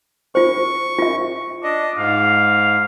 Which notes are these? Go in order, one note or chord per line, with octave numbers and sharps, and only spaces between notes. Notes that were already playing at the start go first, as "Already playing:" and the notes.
F4 C5 C#6
F4 E5
D4 D#5
G#2 F5